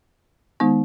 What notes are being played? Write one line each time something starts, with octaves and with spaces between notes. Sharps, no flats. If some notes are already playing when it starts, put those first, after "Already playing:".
D#3 G#3 B3 D#4